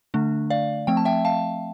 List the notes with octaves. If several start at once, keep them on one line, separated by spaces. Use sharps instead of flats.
D3 A3 D4
D5 F5
F3 A3 C4 G5
A5
E5 G5
F5 A5